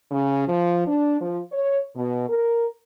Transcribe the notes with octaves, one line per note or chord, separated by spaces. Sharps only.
C#3
F3
D4
F3
C#5
B2
A#4